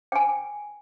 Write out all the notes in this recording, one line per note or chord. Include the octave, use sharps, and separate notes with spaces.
G5 G#5